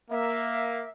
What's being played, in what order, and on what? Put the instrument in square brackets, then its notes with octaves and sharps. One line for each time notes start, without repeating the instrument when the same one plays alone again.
[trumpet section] A#3 [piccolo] E5